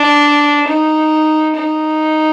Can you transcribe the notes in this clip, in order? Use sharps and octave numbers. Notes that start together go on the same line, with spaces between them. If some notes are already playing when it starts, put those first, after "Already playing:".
Already playing: D4
D#4
D#4